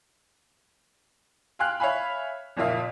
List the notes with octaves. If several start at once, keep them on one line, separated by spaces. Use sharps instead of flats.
F5 G5 G#5 C6 F6 F#6
C#5 E5 F5 G#5 B5
F#1 F2 A#2 E5 F5